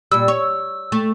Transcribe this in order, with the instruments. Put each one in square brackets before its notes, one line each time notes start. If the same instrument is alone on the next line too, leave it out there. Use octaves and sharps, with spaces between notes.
[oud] A#2 G3 [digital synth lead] E6
[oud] C#5
A3